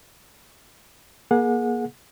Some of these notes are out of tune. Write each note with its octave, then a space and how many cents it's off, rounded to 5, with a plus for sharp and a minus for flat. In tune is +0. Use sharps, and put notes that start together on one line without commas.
A#3 +30 G#4 +20 F#5 -30